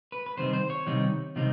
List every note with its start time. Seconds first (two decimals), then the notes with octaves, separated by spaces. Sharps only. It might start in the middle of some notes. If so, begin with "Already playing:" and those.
0.12 B4
0.26 B4
0.37 C3 D#3 G3 C4 D#4 C5
0.53 C5
0.70 C#5
0.86 C3 D#3 G3 C4 D#4
1.36 C3 D#3 G3 C4 D#4